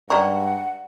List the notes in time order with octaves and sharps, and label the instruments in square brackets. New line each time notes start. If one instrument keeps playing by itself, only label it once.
[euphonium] G2 [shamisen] G3 G#3 D#4 [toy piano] D5 A#5 C#6 [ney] F#5